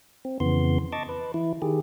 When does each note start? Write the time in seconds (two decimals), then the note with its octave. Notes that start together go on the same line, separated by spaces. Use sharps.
0.25 C4
0.40 F2 C#3 E3 B3 C6
0.93 D#5 A5 C#6 D6
1.09 B4
1.34 E3 E4
1.62 D#3 G4 G#4